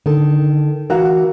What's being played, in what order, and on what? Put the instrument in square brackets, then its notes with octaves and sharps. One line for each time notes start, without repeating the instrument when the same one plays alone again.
[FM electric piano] D3 A4 [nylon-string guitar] D#3
[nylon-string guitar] E3 F#4 F5 [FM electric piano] A#4 F#5 A#5